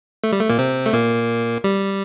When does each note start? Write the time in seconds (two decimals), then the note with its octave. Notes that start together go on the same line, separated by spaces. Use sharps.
0.24 A3
0.32 G3
0.41 A3
0.49 A#2 A#3
0.58 C3 C4
0.86 A3
0.93 A#2 A#3
1.64 G3